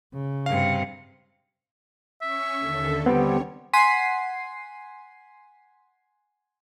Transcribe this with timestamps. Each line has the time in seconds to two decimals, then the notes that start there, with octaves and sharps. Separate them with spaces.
0.14 C#3
0.46 G2 C3 F5
2.22 C#4 E5 C#6
2.59 D#2 D3 A4
3.06 D3 G3 B3 C4 C#5
3.73 F#5 G#5 C6 B6 C7 D#7